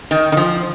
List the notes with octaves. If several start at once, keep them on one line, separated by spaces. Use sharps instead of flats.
D#3
D#3
F3